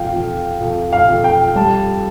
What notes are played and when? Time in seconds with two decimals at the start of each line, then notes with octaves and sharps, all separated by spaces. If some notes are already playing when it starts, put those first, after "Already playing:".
Already playing: F2 F5 G5
0.13 F2
0.61 F2
0.93 F5
1.09 F2
1.24 G5
1.55 G3 A5